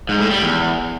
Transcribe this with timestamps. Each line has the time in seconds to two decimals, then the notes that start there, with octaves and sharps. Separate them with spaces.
0.09 G#2
0.20 A2
0.31 G3
0.42 E2